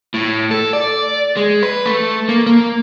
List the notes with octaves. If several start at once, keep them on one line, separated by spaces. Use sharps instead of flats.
A2
A4
D5
G#3
B4
A3
A#3
A#3